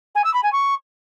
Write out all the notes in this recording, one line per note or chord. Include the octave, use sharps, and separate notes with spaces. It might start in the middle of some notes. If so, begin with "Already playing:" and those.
G#5
E6
B5
G#5
C#6